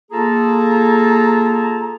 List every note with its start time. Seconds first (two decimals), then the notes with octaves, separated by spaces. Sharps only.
0.12 A#3 F4 G#4 A4 A5 A#5